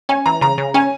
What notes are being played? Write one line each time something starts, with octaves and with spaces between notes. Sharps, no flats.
C#4 G#5
E3 A#5
C#3 A#5
C#3
C#4 G#5